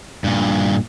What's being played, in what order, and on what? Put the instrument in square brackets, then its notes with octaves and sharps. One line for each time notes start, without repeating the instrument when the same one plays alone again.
[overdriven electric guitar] G2 A#2